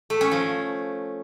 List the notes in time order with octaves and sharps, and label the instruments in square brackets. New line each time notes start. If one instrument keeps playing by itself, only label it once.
[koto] A3
C#4
F3